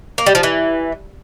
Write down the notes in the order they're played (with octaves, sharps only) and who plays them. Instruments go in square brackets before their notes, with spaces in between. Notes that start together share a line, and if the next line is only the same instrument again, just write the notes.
[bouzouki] A#3
G3
F3
E3